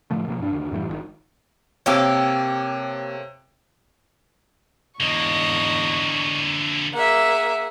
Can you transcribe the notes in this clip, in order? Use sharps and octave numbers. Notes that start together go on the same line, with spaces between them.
A2 D3 F3 A3
B2 F3 A#3
G2 D4
D#2 D3
F#2 A2 E3 G3
G#1 C3 D#3
C3 A#3 G4 A4 C#5
E2 G#2 D3 A#3 D#5 C#6
A#3 G#4 E5 F#5